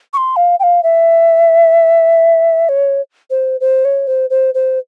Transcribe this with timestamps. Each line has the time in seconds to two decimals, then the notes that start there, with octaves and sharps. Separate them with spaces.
0.13 C#6
0.17 C6
0.36 F5
0.60 G5
0.63 F5
0.83 E5
2.69 C#5
3.30 C5
3.61 C5
3.85 C#5
4.07 C5
4.30 C5
4.54 C5